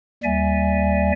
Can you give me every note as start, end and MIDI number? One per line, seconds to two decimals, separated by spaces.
0.23 1.12 39
0.23 1.12 55
0.23 1.12 74
0.23 1.12 76
0.23 1.12 80